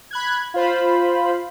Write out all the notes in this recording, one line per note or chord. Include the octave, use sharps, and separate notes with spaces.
B5 F#6 G#6
F4 C5 B5